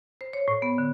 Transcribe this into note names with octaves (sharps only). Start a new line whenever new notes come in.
C5
C#5
A2
B3
D3